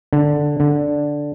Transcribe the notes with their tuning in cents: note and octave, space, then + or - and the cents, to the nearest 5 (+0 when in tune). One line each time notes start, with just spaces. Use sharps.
D3 +0
D3 -5